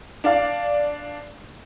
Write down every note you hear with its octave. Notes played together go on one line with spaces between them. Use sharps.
D4 D5 F5